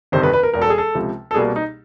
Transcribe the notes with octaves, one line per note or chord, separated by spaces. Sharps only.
G1 F2 C3 D#3 C5
B4
B4
A#4
E1 E2 B2 A#4
A4
G#4
A4
C#2 C3 F3
A4
C2 B2 G3 A#3 G#4
D#4